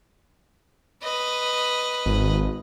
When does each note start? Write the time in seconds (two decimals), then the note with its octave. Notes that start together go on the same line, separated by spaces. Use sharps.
1.04 B4 D#5
2.06 G#1